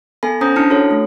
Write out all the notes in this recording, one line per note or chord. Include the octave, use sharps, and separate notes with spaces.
B3 A4 G#5 B5
C#4 C5 A#5 D#6 G6 A#6
D4 E4 A5 F6 C#7
F#4 A4 C#5
A3